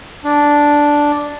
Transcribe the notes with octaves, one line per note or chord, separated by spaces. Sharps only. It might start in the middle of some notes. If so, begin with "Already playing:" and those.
D4